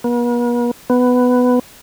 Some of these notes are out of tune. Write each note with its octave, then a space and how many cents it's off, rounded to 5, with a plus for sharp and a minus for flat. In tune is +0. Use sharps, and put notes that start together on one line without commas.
B3 -45
B3 +10